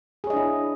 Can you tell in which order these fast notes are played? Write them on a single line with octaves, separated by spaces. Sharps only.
G#4 C#5 D#5 D4 E4